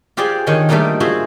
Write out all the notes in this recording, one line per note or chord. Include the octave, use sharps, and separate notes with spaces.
F4 G4 G#4 C5 D5
D#3 D4 C#5 F#5 C6
G3 A3 A#3 D4 D#4 F4
F4 F#4 G#4 C5 E5